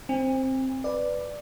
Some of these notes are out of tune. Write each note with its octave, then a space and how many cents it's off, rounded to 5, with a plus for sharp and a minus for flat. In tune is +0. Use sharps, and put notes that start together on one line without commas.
C4 +10 G#5 -45
B4 +5 D5 +5